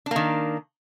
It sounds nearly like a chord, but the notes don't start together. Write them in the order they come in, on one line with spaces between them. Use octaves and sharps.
D4 A#3 D#3